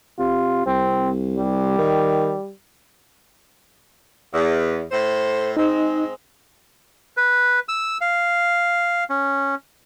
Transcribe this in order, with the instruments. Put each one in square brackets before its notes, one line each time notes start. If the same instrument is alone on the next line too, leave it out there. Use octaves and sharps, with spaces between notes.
[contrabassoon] C3 [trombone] F4
[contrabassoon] C2 [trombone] C4
[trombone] G3
[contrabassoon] D#3
[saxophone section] E2
A2 A4 C5
[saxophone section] G#3 C4 [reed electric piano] D#4
[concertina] B4
E6
F5
C#4